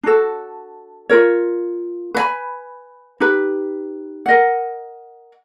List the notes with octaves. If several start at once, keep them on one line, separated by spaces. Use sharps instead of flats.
D4 F#4 A4
F4 A#4 C#5
B4 E5 G#5 B5
D#4 G4 B4
A#4 D#5 F#5